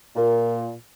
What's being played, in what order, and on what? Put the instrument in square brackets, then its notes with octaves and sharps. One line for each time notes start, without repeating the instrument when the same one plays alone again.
[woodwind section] A#2